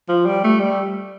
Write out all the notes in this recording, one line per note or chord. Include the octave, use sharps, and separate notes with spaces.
F3
G3
A3
G3